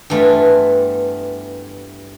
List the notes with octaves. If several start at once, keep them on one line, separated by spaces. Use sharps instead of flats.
G2 E3 A3 B3 F4 B5